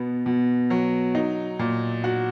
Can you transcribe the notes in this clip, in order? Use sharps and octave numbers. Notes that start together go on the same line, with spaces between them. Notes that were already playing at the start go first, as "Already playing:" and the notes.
Already playing: B2 B3
B2
F#3
D#4
A#2
F#4